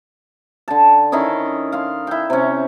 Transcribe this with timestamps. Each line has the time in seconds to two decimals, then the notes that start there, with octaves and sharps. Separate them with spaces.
0.68 D3 A5
1.12 D#3 C#4 E4 D#5
1.72 F5 C6
2.07 E4 G5
2.30 C3 C#4